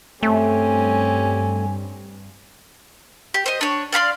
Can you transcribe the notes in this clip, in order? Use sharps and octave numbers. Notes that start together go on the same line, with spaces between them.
G2 A3 C4 C#4 G4 G#5
G4
C5 D#5
D4 C#5
D5 F5 B5 C6